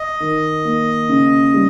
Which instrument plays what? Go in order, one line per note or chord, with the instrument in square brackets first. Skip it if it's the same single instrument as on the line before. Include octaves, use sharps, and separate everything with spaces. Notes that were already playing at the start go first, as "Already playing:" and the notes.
Already playing: [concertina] D#5
[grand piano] D#3
A#3
C#3
G3